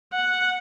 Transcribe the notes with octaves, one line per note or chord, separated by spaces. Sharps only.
F#5